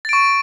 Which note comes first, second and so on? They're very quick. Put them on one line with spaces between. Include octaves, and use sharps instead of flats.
A6 D7 C#6